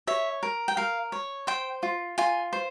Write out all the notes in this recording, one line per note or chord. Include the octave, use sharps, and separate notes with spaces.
C#5 E5
A#4
G5
A#4 F5
C#5
C5 G5
F4
F4 G#5
C5